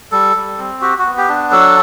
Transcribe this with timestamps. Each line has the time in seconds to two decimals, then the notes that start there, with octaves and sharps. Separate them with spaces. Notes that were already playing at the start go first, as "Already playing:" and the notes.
0.12 G3 A4
0.36 G3
0.59 C4
0.81 F#4 G4
0.99 F#4
1.06 B3
1.17 G4
1.29 D4
1.51 F#3 A4